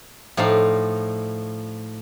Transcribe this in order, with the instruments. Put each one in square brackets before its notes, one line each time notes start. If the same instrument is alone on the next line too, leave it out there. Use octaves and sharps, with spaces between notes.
[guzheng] A2 F3 D#4 D5 F5